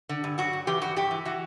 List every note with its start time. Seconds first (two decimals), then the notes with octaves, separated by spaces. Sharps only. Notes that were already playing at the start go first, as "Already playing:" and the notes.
0.09 D3
0.24 G2
0.38 F#3 F#4
0.53 G2
0.67 E3 G4
0.81 G2 F#4
0.96 G2 G4
1.11 E3
1.25 E3 F#4